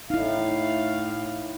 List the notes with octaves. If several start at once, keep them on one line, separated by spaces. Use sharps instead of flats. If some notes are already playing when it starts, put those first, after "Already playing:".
A2 D#4 E4 F5